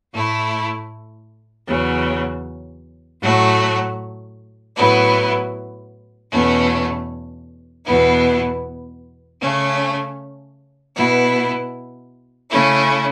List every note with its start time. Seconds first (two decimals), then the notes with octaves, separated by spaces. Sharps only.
0.12 A2 A3 E4
1.66 E2 C#3 F#3
3.21 A2 F#3 A3 F#4
4.76 A2 F#3 B3 E4
6.31 E2 B2 A3 C#4
7.86 E2 B2 B3 E4
9.41 C#3 A3 C#4
10.96 B2 B3 E4
12.50 C#3 A3 C#4 E4